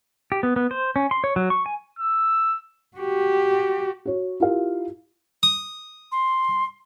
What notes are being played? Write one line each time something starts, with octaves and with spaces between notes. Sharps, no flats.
G4
B3
B3
C5
C#4
C6
C#5
F#3
C#6
G#5
E6
F#4 G4
F#4 C#5
E4 F4 G4 A#4 F5
D#6
C6